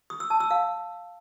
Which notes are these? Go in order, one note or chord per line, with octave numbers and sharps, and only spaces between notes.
D#6
E6
A5
E6
F5